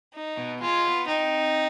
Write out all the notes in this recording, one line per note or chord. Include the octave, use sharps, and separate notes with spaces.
D#4
B2
G#3 F4
B3
C4 D#4